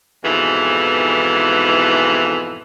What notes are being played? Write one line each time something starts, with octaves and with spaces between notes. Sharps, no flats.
F2 G#2 B2 E3